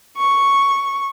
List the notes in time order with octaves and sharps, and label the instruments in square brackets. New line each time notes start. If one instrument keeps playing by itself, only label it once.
[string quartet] C#6